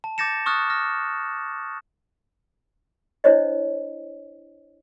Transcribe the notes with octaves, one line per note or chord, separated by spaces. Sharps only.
A5
D6 G6 A6 A#6 C#7 E7
C#6 D#6 F6 F#6 A6
F6 A#6
D4 E4 C5 C#5 D#5